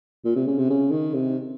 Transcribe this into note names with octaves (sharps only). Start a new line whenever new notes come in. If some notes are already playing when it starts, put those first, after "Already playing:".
A#2
C3
C#3
C3
C#3
D#3
C3